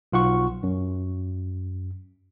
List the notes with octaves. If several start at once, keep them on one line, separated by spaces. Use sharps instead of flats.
B1 F4 F#5 C#6
F#2